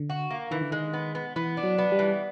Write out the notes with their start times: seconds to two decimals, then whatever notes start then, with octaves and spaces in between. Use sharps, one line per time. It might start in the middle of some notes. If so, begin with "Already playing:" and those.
Already playing: D3
0.10 F#4
0.31 A#3
0.51 D#3 E3
0.61 D3
0.72 D#3 G#3
0.93 B3
1.15 B3
1.36 E3 B3
1.57 D4
1.64 F#3
1.78 B3
1.92 G3
1.99 E3